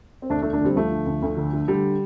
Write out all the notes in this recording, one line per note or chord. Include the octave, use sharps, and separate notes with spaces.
C4
D2 A3 D4
A3 D4
D3
A3 D4
D3 G3 C4
D2 F3 A3
D3
D2
D2
D3
D3
D3 G3